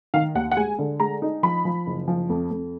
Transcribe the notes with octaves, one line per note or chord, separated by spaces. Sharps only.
D#3 F5
D#2 F#5
F#5
G#3 G#5
D3
G#3 A#5
D#4
F3 B5
F3
F#1
F3
F2
F2